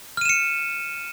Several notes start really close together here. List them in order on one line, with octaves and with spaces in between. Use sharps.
F6 D#7 E7 C#7